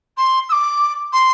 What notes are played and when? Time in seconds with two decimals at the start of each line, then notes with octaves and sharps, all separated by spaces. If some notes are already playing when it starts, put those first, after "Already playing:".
0.17 C6
0.48 E6
0.52 D6
1.12 C6